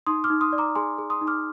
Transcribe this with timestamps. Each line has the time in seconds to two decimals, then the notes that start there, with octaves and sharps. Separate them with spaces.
0.06 D#4 C6 D#6
0.24 D6 F6
0.30 D#4
0.41 C6 D#6
0.53 D5
0.58 A#5 D6
0.75 G#4 G#5 C6
0.98 G#4
1.10 C6 D#6
1.21 D#4
1.27 D6 F6